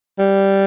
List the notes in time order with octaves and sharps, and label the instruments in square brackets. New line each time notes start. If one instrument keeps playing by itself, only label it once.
[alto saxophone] G3